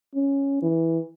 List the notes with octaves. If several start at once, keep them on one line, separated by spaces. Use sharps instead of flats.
C#4
E3